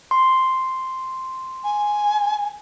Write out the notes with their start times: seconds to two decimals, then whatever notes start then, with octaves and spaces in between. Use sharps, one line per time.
0.11 C6
1.64 G#5